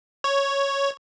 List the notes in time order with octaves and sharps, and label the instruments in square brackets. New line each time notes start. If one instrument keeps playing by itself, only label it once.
[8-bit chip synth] C#5